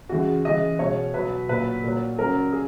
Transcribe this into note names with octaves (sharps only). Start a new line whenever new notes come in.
C#3 E3 G#3 F#4
C#3 E3 G#3 D#5
B2 G#3 C#5
B2 F#3 B4
A#2 F#3 B4
A#2 F#3
C#3 F#3 A#4
G#4